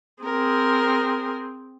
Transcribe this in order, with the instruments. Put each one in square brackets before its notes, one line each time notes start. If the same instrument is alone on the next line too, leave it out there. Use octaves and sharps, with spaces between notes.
[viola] C4 G#4 [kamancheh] A#4